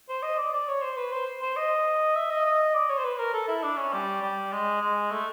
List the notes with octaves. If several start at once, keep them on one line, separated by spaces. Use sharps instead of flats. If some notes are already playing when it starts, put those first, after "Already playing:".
C5
D#5
D5
D5
C#5
C5
B4
C5
C5
D#5
E5
D#5
D#5
D5
C#5
C5
B4
A#4
A4
E4
D4
C#4
G3
G3
G#3
G#3
A3